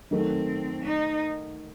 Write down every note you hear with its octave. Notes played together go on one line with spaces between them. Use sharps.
D#3 F#3 A3 C4
D#4